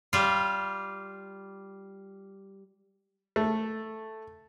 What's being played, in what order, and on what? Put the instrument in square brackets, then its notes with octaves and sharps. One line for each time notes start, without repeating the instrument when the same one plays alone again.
[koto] G3 F4
[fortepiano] A3